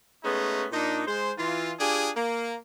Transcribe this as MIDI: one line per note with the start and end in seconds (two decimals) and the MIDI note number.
0.24 0.65 56
0.24 0.65 57
0.24 0.65 59
0.24 0.65 61
0.24 0.65 63
0.72 1.02 46
0.72 1.02 62
0.72 1.02 63
1.06 1.31 56
1.06 1.31 72
1.37 1.72 52
1.37 1.72 65
1.79 2.09 62
1.79 2.09 65
1.79 2.09 67
1.79 2.09 68
2.15 2.54 58